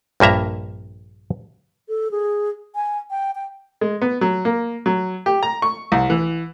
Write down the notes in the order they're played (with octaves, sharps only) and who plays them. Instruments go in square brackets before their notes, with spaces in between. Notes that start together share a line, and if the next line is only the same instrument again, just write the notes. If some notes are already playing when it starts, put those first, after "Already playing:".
[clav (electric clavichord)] A#1 G2 A#3 E5 A#5
[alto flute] A4
G#4
G#5
G5
G5
[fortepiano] G#3
B3
F#3
A#3
F#3
G4
A#5
C#6
C2
E3